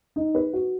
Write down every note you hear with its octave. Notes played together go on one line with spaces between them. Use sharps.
D#4
B4
F#4